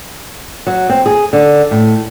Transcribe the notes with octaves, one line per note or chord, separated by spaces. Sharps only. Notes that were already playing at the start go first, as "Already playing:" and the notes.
F#3
C4
G#4
D3
A2